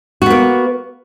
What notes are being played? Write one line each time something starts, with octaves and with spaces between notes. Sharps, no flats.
A#3 B3 F#4